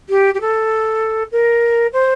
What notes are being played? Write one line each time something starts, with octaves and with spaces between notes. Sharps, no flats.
G4
G4
A4
A#4
C5